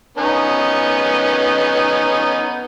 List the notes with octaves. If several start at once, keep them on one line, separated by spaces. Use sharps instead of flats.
B3 C#4 D#4